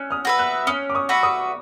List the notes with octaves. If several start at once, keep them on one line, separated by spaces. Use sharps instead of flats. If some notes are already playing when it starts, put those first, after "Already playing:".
Already playing: C#4 E6 F#6
D#6 F6
F#4 B4 E5
E6 F#6
C#4 D#6 F6
D6
C#6 D#6
F#4 B4 E5
C#6 D#6